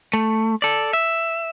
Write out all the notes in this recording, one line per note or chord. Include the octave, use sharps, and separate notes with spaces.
A3
A4 D5
E5